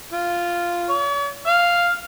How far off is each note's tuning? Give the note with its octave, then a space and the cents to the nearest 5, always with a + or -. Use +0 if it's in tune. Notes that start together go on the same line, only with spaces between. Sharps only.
F4 -5
C#5 +45
F5 +0